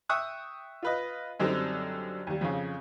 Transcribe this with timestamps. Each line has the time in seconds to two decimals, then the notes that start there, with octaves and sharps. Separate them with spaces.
0.09 E5 G5 C#6 D#6 F#6
0.83 F4 B4 D#5
1.40 F#2 D3 G3 C4 D#4
2.27 D#2 G3
2.41 F2 C#3